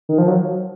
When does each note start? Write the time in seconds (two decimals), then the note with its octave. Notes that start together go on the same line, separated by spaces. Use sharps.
0.09 D#3
0.18 F3
0.27 F#3